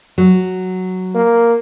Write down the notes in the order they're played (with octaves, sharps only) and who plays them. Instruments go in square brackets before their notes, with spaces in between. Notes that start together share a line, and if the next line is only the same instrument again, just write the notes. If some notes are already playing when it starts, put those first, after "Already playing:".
[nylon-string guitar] F#3
[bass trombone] A#3